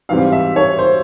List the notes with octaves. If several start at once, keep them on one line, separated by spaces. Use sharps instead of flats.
G#2 E3 G3 C4 F5
E5
C#5
C5